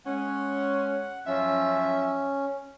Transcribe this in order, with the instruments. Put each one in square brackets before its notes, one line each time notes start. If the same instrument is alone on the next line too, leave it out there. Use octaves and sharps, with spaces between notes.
[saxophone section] G#3 C#4 [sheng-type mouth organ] F#5
[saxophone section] F#2 F3 E5 [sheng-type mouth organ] C#4